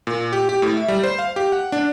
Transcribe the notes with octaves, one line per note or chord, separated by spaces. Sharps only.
A#2
G4
G4
A2
E5
G3
C5
F5
G4
F#5
D4